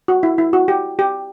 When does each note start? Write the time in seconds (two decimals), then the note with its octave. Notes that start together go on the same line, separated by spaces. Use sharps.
0.08 F#4
0.23 E4
0.38 E4
0.53 F#4
0.68 G4
0.99 G4